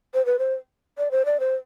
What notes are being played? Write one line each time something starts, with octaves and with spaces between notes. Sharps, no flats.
C5
B4
C5
D5
C5
D5
C5